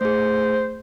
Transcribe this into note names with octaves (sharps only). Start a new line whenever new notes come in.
A3 G#4 C5